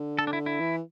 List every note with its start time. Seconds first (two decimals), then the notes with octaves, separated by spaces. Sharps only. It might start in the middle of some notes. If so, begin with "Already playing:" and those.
Already playing: D3
0.19 A4
0.27 D4
0.33 E4
0.46 E4
0.60 E3